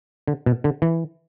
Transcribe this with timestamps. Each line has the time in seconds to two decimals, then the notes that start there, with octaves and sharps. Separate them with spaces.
0.27 D3
0.46 B2
0.64 D3
0.82 E3